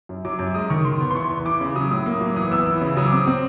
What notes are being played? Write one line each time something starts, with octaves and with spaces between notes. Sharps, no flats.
F#2
F#3 D6
F#2
G#3 D#6
D#3 C#6
D#3 C6
B3
C6
E3 C#6
E2
E3 D6
C#3
F#3 D#6
A2 D#6
A#3
F#3
E3 D#6
B3 E6
E3 E6
C#3
F#3 D#6
D6
C4 D#6
C4